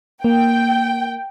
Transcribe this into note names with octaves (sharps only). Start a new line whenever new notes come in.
A#3 G5